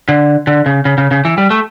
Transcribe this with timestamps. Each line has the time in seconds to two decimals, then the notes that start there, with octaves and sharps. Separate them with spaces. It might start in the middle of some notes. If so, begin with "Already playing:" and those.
0.09 D3
0.47 D3
0.66 C#3
0.85 C#3
0.98 C#3
1.11 C#3
1.25 E3
1.38 G3
1.50 A3